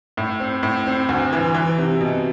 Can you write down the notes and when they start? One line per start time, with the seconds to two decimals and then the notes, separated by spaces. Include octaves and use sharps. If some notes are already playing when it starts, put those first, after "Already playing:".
0.17 A2
0.40 C4
0.63 A2
0.87 C4
1.09 D2
1.33 E3
1.54 E3
1.78 C3
2.01 B2